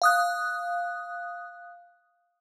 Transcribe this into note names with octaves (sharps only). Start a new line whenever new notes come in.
F5 D#6 F#6